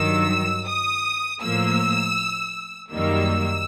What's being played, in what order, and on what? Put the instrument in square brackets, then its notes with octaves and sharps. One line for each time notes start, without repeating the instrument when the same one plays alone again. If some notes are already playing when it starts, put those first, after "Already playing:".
Already playing: [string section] G2 D#3 F#3 E6
D#6
A2 F3 A#3 E6
F#2 D#3 G3 A#3 E6